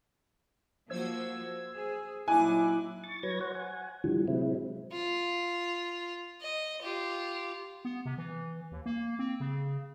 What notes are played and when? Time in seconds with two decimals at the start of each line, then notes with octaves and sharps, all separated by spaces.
0.90 F3 A#3 F#4 C5 E6 G#6
1.73 G#4
2.28 A#2 F#3 D#4 E4 G#5 D6 F#6
3.04 C#6 A6
3.23 F#3 B4 C#5 G#6 A#6
3.41 C5 C#5 F#5
3.55 F#5 G#5
4.04 A2 D3 E3 F3 G3
4.28 C3 F#3 G#3 C4 E4
4.92 F4
6.41 D#5
6.82 F4 G4
7.85 B3
8.05 C3
8.18 E3
8.72 D#2
8.86 A#3
9.19 C4
9.40 C#3